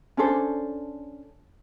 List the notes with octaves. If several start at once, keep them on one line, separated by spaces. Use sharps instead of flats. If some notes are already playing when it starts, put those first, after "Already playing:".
C#4 D4 A4 C5